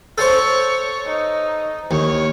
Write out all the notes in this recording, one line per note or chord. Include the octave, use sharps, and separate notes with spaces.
A4 C5 C#5
D#4
D#2 C#5